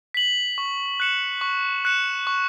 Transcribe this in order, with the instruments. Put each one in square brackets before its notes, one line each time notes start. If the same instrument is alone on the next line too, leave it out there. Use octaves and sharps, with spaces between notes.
[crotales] B6 F#7
C#6
F#6 C#7 E7
C#6
F#6 C#7 E7
C#6